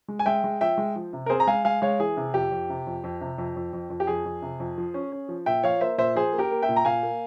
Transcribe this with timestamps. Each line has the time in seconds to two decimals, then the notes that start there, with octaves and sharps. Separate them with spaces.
0.08 G#3
0.19 G#5
0.26 G#3 E5 G5
0.44 G#3
0.61 F3 E5 G5
0.78 G#3
0.96 F3
1.13 C3
1.26 A#4
1.30 C4 G#4 C5
1.40 A#5
1.47 G#3 F5 G#5
1.65 G#3 F5 G#5
1.82 G#3 C#5 F5
2.00 E3 G#4
2.17 C3
2.34 F2 G4
2.51 F2
2.70 C3
2.87 F2
3.04 F2
3.21 C3
3.38 F2
3.56 F2
3.73 F2
3.90 F2
4.00 G4
4.07 F2 G#4
4.25 F2
4.42 C3
4.60 F2
4.78 F3
4.94 C#4
5.12 C#4
5.29 F3
5.46 A#2 E5 G5
5.63 F3 C#5 F5
5.81 A#3 C5 E5
5.98 A#2 C5 E5
6.15 F3 G#4 C5
6.33 A#3
6.39 G4 A#4
6.51 A#3
6.62 E5 G5
6.69 A#2
6.76 A#5
6.85 A#2 F5 G#5
7.03 A#3